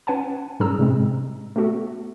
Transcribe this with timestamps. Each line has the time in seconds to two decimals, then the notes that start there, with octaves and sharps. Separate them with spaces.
0.07 C#4 B4 F#5 G#5 A5
0.60 G#2 G3 C#4 G#4 A#5 E6
0.78 A2 C3 G#3 C4
1.56 A3 B3 F#4 A4